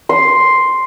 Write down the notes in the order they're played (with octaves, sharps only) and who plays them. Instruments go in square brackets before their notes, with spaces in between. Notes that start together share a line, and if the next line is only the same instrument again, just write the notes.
[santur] C6